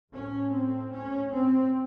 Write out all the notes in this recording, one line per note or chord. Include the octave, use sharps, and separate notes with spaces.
A2 C#4
C4
C#4
C4